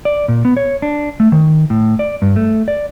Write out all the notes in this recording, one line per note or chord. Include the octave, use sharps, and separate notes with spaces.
D5
A#2
B3
C#5
D4
A3
D#3
A2
D5
G2
A3
D5